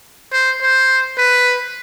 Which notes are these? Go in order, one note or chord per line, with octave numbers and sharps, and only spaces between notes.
C5
C5
B4